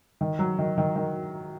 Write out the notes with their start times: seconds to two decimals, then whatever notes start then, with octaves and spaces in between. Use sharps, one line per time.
0.21 D#3
0.39 F#3
0.59 D#3
0.78 D#3
0.96 D#3